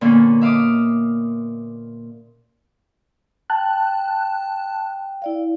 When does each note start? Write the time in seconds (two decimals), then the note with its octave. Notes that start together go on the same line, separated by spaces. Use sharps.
0.01 A#2 D3 A#3 B3 C#4
0.41 E5 F5 D6 D#6
3.50 G5 A5 F#6
5.22 E4 D5 F5